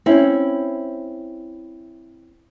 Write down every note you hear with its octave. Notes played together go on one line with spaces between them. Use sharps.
C4 C#4 E4